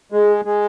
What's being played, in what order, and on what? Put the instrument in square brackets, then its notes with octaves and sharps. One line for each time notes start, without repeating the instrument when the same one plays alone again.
[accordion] G#3 [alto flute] G#4
[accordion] G#3